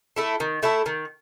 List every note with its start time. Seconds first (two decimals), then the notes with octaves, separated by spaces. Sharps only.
0.16 A3 E4 A4
0.40 D#3
0.63 A3 E4 A4
0.86 D#3